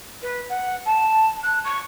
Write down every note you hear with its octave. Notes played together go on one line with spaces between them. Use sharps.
B4
F#5
A5
F#6
C#6